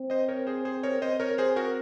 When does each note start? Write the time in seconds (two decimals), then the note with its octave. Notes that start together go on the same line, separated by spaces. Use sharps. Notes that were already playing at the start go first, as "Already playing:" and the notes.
Already playing: C4
0.10 C5 D#5
0.29 A#4 C#5
0.47 G#4 C5
0.65 G#4 C5
0.83 A#4 C#5
1.02 C4 C5 D#5
1.20 A#4 C#5
1.38 G#4 C5
1.56 F#4 A#4